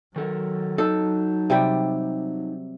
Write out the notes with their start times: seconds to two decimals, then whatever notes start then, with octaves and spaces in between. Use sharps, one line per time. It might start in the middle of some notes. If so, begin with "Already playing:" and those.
0.16 D#3 F#3 A4 A#4
0.78 D#4 A4 A5
1.50 C3 G3 G5